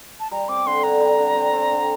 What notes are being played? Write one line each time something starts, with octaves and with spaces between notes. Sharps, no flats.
A5
G3 A#5
C4 D6
D3 C6
D3 A#5
G3
D3
C4
C4
D3